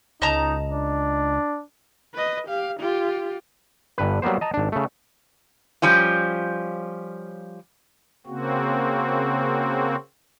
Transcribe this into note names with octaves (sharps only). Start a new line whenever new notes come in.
C#2 D#4 D#5 A5 A#5
D4
B4 D#5
G4 F5
F4 G4
G1 G2 B4
F#3 G3 A#3 B3 C5
D#5 A5 A#5
G#1 D4
C#3 A3
F3 G3 C#4 F4
C#3 A#3 C4 F#4